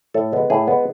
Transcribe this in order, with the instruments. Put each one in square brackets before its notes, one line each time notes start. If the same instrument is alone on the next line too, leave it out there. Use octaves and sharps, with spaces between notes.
[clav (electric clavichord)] A2 A4
G#3 B3
A2 G#4
G#3 B3